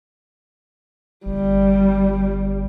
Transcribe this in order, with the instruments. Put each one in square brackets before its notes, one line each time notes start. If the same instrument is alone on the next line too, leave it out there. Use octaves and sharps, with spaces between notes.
[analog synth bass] G1 [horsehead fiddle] G3